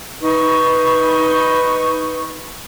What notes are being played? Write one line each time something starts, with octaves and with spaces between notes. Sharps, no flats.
D#4 B4 C#6